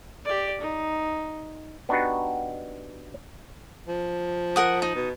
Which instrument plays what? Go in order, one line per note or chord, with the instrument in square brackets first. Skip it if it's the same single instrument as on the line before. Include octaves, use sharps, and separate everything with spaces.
[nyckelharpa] G4 D5
D#4
[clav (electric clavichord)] B3 D4 D#4 F#4 G4 B4
[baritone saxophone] F3
[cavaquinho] A#4 F#5 D#6
D#4
[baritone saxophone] B2